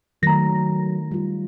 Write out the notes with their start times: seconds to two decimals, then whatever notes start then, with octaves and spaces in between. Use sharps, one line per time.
0.23 D#3 F#3 A3 A#5 A#6
1.11 G3 F4